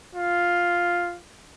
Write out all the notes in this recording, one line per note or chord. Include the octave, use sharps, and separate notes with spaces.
F4